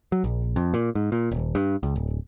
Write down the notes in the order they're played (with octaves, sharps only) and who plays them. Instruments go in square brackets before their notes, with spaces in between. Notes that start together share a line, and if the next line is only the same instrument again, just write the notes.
[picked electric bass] F#3
A#1
F2
A#2
G#2
A#2
D#1
G2
C#2
D1